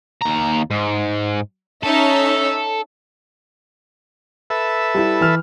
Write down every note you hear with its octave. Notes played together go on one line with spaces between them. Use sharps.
D#2 A#5
G#2
C#4 D#4 A4 E5
A4 B4 E5
G3 E4
E3 F6